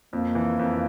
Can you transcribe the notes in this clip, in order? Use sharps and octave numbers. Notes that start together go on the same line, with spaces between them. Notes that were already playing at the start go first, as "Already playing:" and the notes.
F2 A#3
E3
F2